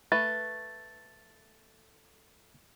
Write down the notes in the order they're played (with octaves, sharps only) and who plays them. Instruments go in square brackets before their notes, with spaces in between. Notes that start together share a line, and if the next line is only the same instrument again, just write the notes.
[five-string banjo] A3 B4 [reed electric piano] A6